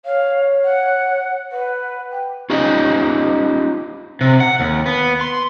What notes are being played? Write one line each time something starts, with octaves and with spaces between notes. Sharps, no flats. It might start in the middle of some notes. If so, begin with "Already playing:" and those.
C#5 F5
F#5
B4 F#5
G5
C#4 D#4 F4 G4 D5 D#5
C3
F#5
D#2
B3
C6